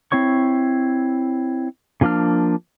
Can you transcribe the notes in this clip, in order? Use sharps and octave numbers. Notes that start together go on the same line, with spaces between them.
C4 E4 C#5 C#6
C#3 F3 A#3 D4 F6